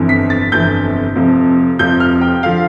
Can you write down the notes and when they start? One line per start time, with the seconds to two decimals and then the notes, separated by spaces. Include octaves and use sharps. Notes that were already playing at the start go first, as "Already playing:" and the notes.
Already playing: G1 F2 C3 E3
0.09 B6
0.30 A6
0.52 G1 F2 C3 E3 G6
1.15 F1 F2 C3 F3
1.79 F1 F2 C3 F3 G6
2.00 F6
2.21 G5
2.43 D3 F3 F5